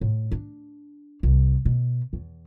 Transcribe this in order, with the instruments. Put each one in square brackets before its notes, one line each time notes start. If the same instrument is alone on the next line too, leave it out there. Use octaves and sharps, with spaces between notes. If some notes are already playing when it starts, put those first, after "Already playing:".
[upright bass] A2
D4
C2
B2
E2